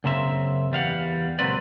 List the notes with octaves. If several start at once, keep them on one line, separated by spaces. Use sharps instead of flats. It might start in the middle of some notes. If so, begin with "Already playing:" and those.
F#2 C#3 A#3 C4 E5
E2 G3 F5 F#5
C#2 A#2 F#3 C4 B4 D5